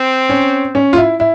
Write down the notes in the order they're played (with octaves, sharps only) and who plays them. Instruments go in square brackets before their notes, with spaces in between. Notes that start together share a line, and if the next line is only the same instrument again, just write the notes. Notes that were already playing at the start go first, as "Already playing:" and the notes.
Already playing: [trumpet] C4
[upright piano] C#4
C#4
F4
E4
E4